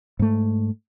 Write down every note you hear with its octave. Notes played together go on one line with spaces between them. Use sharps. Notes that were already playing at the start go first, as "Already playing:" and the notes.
G#2 A3